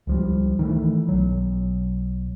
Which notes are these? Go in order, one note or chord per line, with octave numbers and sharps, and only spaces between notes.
C#2 F3 G3
D#3 E3 A3
B1 F#3